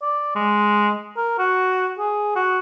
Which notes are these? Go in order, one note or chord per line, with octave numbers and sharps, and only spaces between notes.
D5
G#3
A#4
F#4
G#4
F#4